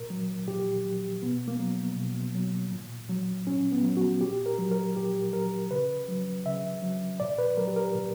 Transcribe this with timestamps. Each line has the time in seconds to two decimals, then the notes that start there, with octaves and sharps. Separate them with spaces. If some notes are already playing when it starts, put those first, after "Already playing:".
Already playing: A#2 A#4
0.10 F#3
0.48 A#2 G4
0.85 F#3
1.22 B2 B3
1.48 A#3
1.60 F#3
1.97 B2
2.34 F#3
2.72 A#2
3.09 F#3
3.47 A#2 C#4
3.72 B3
3.84 F#3
3.97 F#4
4.21 A#2 G4
4.46 A#4
4.59 F#3
4.71 A#4
4.96 A#2 G4
5.33 F#3 A#4
5.71 C#3 B4
6.08 F#3
6.45 C#3 E5
6.82 F#3
7.20 A#2 D5
7.38 B4
7.57 F#3 A#4
7.67 G4
7.76 A#4
7.95 A#2